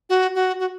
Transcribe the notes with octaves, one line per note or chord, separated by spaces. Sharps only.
F#4
F#4
F#4